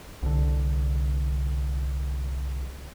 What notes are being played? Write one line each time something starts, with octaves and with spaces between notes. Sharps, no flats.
C2 D3